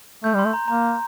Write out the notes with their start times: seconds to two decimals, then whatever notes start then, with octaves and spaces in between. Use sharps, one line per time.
0.24 A3 G6
0.35 G3 C6
0.45 A3
0.53 A#5
0.68 A#3 A#5